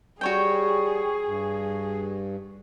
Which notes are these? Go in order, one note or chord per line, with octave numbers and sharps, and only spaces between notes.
G3 F#4 G#4 C#5 G5
G2